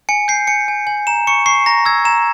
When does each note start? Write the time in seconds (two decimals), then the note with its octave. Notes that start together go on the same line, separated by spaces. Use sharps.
0.09 G#5 C#7
0.28 G6 C7
0.47 G#5 C#7
0.68 G#5
0.87 G#5
1.07 A#5 E7
1.27 C#6 C#7
1.46 C#6 C7
1.66 A#5 A#6
1.85 E6 G#6
2.05 A#5 E7